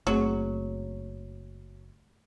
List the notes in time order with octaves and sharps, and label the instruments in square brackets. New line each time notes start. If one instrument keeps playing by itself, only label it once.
[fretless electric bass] F#1 [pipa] F#3 [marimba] A3 C4 G#4